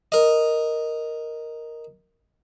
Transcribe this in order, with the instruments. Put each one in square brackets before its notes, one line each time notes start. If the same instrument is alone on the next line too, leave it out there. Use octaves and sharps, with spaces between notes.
[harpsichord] A#4 D#5